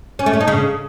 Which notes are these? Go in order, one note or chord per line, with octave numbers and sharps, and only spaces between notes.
C#4
A3
C#4
D#4
C#3